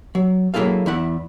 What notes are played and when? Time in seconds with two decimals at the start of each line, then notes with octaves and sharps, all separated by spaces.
0.15 F#3
0.54 F#3 A#3 E4 G#4 A4 F5
0.86 E2 E4 F#5